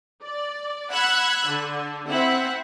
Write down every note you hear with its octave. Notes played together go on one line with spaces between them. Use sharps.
D5
F#5 B5 E6 F#6 G#6
D3
C4 E4 E5 F#5